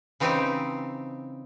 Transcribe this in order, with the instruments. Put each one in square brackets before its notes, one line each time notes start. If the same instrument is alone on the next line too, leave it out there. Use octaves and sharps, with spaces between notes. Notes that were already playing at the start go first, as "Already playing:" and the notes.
[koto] C#3 E3 C4 D#4 G4